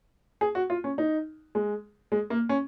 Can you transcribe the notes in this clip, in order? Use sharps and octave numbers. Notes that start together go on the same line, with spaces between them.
G#4
F#4
F4
C#4
D#4
G#3
G#3
A#3
C#4